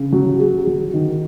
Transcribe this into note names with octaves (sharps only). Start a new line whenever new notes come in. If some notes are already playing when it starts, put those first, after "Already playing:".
Already playing: C#3
F#3
G#4
F#3
D#3